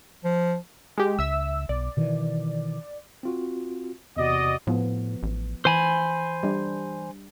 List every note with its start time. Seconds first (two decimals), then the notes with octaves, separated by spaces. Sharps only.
0.24 F3
0.98 G#3 G4
1.19 C#2 E5 E6
1.69 B1 D5
1.97 B2 D#3 E3
3.23 C4 F4 F#4
4.17 E2 C3 F#4 D5 D#5
4.67 A2 F3 B3
5.23 A1
5.65 E3 C5 G#5 B5
6.43 G3 D4